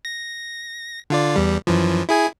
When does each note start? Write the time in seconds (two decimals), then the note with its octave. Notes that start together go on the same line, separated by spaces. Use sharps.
0.05 A#6
1.10 D3 F4 D5
1.36 E2 G3
1.67 F#2 E3 F3
2.09 E4 G#4 G#5